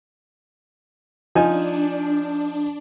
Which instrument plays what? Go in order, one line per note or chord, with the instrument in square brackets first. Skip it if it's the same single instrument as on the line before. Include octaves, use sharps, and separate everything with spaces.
[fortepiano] F3 D#4 G#5 [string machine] D4